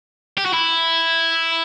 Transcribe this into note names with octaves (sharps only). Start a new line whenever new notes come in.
G4
F#4
E4